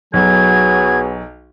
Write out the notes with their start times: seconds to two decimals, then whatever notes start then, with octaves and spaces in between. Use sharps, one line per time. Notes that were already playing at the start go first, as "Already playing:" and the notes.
0.13 B1 F#3 B3 F#4 G#4 G#6